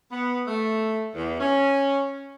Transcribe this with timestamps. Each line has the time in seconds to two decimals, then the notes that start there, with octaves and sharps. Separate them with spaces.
0.11 B3
0.47 A3
1.15 E2
1.40 C#4